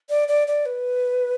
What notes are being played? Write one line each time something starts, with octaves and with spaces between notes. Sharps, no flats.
D5
D5
D5
B4